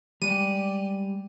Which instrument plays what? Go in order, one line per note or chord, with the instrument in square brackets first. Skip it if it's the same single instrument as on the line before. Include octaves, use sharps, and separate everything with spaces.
[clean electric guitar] G3 G#3 [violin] G4 D5 [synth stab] D#7